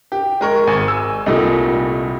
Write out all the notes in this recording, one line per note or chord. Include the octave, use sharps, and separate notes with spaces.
G4
G#3 A#4 C#6
G#1 G#5
E6
C2 A#2 G3 A3 D#4